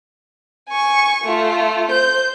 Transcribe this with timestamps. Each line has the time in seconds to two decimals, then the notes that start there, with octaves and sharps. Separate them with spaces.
0.69 G#5 C#6
1.24 A3 F4
1.92 C5 G6